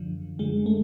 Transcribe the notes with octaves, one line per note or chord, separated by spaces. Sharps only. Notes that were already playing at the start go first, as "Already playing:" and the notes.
Already playing: F#2 D3 F3
F#2 D3 F3 G#3
A3